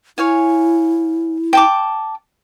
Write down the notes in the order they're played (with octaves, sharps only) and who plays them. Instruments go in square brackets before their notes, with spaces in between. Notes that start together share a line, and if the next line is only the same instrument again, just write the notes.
[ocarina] E4 [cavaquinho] C#5 F5 G#5
[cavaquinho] G5 A5 D6